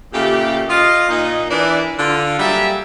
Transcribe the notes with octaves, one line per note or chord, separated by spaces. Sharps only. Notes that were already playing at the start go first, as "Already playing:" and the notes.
A#2 C#3 A3 G4
F4 D#5
A#2 D#4 D#5
E3 D4 A#4
D3 F4
F#3 G3 A#3 G4 G#4 E5